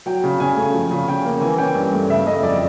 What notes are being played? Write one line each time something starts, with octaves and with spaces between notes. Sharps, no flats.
F#3 G5
C#3
C#3 G#5
A3
F3
C#3
C#3 G5
A#3
E3 G#5
C#4 G5
G2
A3
C#3 E5
A3 D#5
F2 D5